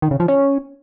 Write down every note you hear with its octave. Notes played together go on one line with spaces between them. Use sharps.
D#3
C#3
F3
C#4